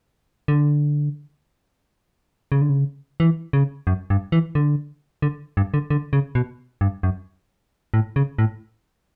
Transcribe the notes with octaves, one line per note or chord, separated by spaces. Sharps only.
D3
C#3
D3
C#3
E3
C#3
F#2
G2
E3
D3
D3
G2
D3
D3
C#3
B2
G2
F#2
A2
C#3
A2